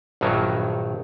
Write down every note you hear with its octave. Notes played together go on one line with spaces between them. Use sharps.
A#1 G2 D#3 F#3